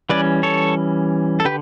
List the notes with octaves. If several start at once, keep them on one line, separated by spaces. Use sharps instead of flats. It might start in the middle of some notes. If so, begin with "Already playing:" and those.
E3 G3 C#4 B4 D5
A4 C#5
A4
D3 G4 B4